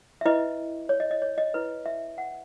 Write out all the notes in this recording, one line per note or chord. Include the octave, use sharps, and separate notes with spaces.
E5
E4 B4 D#5
C#5
D#5
D#5
C#5
D#5
E4 B4
E5
F#5